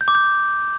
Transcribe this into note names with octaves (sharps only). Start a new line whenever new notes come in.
G6
D6
G6